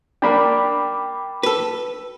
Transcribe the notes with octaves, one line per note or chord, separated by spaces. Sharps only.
A#3 D4 G5 B5 D6
A4 B4